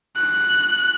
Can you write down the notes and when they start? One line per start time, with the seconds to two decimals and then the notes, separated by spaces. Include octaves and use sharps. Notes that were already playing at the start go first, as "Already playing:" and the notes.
0.17 F#6